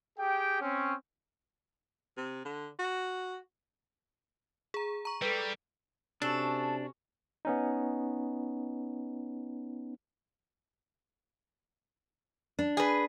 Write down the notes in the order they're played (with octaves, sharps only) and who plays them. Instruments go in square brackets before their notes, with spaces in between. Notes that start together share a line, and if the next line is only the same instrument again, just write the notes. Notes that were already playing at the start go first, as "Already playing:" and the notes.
[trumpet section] G4 G#4 G5
C4 C#4
[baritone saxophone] C3
D3
F#4
[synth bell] G#4 A#5
A#5 C#6
[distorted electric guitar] G3 [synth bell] A4 B4
[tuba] C3 [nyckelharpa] C#4 F#4 [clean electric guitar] D4 [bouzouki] A4
[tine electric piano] B3 C#4 D#4
[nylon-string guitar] D4
[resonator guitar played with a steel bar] G#4 B4